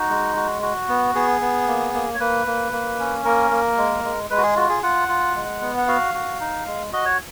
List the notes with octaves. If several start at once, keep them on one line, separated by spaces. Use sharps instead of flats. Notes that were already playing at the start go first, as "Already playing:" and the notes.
Already playing: D#4 F#4
G#3
F#4
F#4
B3
B3 G#4
B3
A#3
A#3
C#5
A#3 B4
A#3
A#3
C#4
A#3 A#4
A#3
G#3
G#3
G#3 B4
F#4
G#4
F4 F#4
G#4
F4 F#5
F4
G#3
B3
F#5
F#4 F5
F#4
D#4
G#3
F#4 D#5
C#5